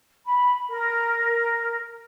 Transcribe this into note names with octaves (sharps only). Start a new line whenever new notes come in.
B5
A#4